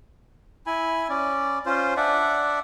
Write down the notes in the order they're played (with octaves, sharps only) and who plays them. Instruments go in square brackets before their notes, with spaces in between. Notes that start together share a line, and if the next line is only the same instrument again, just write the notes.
[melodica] E4 G#5 B5
C#4 D5
C#4 F4 C5
D4 D5 E5 F#5